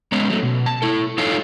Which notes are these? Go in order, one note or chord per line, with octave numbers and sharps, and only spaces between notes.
G#3 B3 C#4 A#5
F#3 A3
B2
A5
E4 A4
D#4 F4 A4 C#5 F5